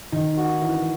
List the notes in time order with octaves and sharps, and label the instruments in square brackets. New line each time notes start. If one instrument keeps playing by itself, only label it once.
[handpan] D#3 [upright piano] D#4
[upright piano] F#4
E3